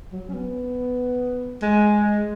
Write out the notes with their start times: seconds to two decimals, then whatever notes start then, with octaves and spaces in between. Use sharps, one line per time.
0.12 F#3
0.29 C#4
0.34 B3
1.62 G#3